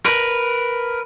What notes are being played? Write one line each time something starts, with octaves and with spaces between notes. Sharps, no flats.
A#4 B4